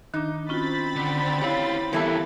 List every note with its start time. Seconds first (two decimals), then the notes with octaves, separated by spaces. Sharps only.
0.14 D#3 D4 D#4
0.49 C4 C#4 F4 F#4 B5 A6
0.96 D3
1.42 E4 G4 C#5 F5
1.93 E3 G3 B3 E4 G4 A4 A#4